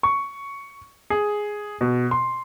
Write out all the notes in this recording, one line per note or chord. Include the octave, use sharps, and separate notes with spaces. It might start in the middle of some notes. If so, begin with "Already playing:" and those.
C#6
G#4
B2
C6